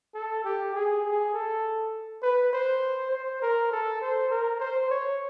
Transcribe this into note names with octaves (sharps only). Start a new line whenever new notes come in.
A4
G4
G#4
G#4
A4
B4
C5
C5
A#4
A4
C5
A#4
C5
C#5